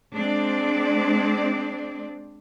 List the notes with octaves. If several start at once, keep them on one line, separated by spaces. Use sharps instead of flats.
G#3 C4 D4 D5